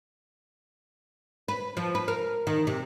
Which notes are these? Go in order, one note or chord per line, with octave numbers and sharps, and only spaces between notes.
B4
F3
B4
A#4
D#3
C3